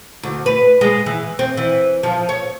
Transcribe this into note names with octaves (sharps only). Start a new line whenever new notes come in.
D2
B4
G#3
E3
C4
E3
F3
C#5